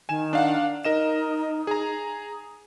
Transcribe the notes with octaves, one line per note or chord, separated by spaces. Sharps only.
D#3 G#5 E7
D4 F5 F#5
D#4 A#4 D#5 E7
G#4 A#5